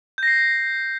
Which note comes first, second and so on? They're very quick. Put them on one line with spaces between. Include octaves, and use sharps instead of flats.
G6 A#6 C7